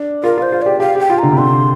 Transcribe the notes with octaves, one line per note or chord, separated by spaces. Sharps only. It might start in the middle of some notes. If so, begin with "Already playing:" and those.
Already playing: D4
F4 A#4
F4 C5
F4
G4 D5
G4 F5
G4 G5
F4
D3 A#5
C3
D3 C6